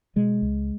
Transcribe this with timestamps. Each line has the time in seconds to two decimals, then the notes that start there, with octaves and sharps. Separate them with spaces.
0.16 B2 G#3
0.42 C#2